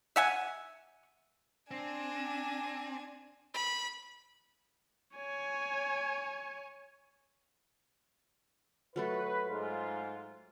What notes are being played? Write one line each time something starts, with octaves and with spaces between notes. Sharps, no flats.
E5 F#5 G#5
C4 D4 G#5
B5
C#5 G#5
F#3 A3 A4 B4
G#2 F4